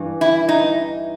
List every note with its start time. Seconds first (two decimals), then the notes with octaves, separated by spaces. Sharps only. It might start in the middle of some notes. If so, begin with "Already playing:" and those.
Already playing: G2 E3
0.21 E4
0.49 D#4